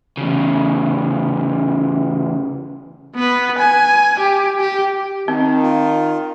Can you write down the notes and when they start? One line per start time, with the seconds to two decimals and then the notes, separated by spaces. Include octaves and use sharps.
0.17 E2 C#3
3.15 B3 B4
3.59 G#5
4.20 G4
4.60 G4
5.28 D#3 C4
5.62 F4